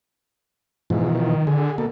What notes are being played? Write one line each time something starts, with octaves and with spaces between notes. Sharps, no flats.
G#2 B2 E3 F3
D#3
D3 G#4
B2 A#3 A4